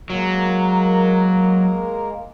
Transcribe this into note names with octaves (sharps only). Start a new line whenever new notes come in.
F#3 G#3 A#3 A#4